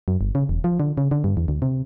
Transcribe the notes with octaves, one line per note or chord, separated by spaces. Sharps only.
F#2
G1
C#3
E1
F3
D3
C#3
D3
G2
E2
D2
C3